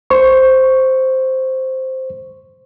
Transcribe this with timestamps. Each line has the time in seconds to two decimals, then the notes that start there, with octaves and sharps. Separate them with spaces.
0.10 C5 C#6